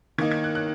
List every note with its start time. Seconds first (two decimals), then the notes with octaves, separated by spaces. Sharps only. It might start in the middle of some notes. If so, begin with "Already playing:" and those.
0.18 D#3 A#3 D#4 G#6
0.31 G#6
0.44 F#6
0.55 F#6